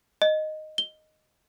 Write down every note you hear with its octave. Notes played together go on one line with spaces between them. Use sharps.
D#5
G7